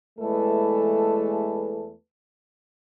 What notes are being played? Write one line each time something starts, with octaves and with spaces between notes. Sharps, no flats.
E2 E3 G#3 A3 A4 B4